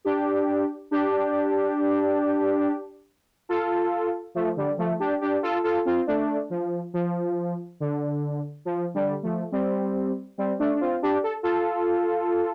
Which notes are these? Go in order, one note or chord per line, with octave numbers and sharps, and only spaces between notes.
D4 G4
D4 G4
F4 A4
F3 A3
D3 G3
F3 A3
D4 G4
D4 G4
F4 A4
F4 A4
C4 F4
A3 D4
F3
F3
D3
F3
D3 G3
F3 A3
G3 C4
G3 C4
A3 D4
D4
C4 F4
D4 G4
A4
F4 A4